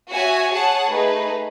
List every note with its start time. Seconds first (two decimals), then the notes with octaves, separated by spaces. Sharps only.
0.12 F#4 C#5 E5 G#5
0.51 G#4 C#5 F#5 A5
0.90 A3 D#4 G#4 B4